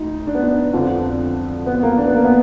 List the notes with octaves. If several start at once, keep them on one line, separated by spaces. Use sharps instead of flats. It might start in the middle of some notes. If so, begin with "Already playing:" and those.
Already playing: D2 D#4
D4
B3
D4
F2 D3 F3 D4
B3
A#3
D4
B3
A#3
B3